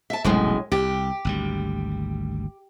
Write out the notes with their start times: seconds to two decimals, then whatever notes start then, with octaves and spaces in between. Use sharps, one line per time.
0.10 E5 A5
0.24 F1 B1 F#2 A2 G#3
0.72 C2 G4
1.25 G#1 D2 G3